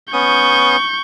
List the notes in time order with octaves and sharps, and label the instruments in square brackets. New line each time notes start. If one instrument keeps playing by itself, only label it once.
[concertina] B3 C#4 D#6 [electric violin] C#6 G6